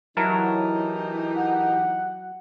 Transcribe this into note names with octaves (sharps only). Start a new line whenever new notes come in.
E3 F#3 D#4 E4 G4 A#4 A5
F#5